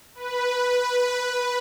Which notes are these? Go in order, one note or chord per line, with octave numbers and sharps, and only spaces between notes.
B4